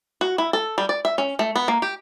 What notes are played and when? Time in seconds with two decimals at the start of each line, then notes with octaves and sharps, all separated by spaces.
0.21 F#4
0.38 E4
0.53 A4
0.78 G3
0.89 D5
1.05 E5
1.18 C#4
1.39 A3
1.56 B3
1.68 A#3
1.82 G4